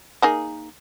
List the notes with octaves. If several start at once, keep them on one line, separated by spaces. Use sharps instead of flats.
A#3 D#4 G#4